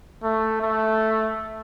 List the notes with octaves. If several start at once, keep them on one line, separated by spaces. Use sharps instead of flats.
A3
A3